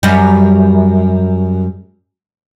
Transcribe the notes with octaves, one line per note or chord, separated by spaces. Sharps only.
F#2 G3